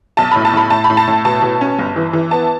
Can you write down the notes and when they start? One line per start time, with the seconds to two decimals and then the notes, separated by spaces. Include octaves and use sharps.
0.17 B1 A5
0.31 A2 B5
0.45 A5
0.53 A2 B5
0.70 A2 A5
0.84 B5
0.90 A2
0.97 A5
1.08 A2
1.25 B2 A5
1.42 B2
1.61 C#4
1.78 G1
1.96 E3
2.13 E3
2.31 B3 A5